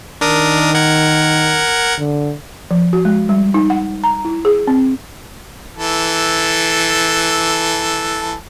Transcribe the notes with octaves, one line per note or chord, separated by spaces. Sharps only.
D#3 D4 A#4 D#6
A#4 F#5 G#6
D3
F3
F#4
G#3
G3
D#4
F#5
A#5
E4
G#4
C4
E3 A4